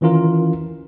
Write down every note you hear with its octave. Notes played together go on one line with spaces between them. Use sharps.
D#3 E3 C#4 F4 A#4